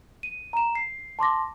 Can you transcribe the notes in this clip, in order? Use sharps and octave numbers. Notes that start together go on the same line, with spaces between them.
D#7
A#5 E7
C7
A5 C6 D6 A#6